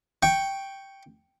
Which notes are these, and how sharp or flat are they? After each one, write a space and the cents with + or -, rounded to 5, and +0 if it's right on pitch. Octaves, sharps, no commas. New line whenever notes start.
G5 +0 C#6 +0